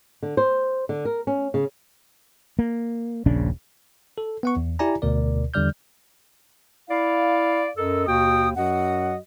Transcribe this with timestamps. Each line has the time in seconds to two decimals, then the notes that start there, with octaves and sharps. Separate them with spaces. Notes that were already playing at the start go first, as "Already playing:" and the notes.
0.23 D3
0.37 C5
0.89 D3
1.05 A#4
1.27 C#4
1.54 C#3
2.59 A#3
3.26 D#1 A#1 C#3 D4
4.18 A4
4.43 B3 F#5 C#6
4.57 E2
4.79 E4 G4 D5 G#5 A#5
5.02 D2 B2 A#4 D5
5.54 E2 D3 G3 D5 F6 G6
6.88 E4 D5 F5
7.77 F#2 A4 A#4 D#5 E6
8.06 D#2 B2 F#4 G5 D#6
8.56 F#2 F#3 F#4 D#5 F#5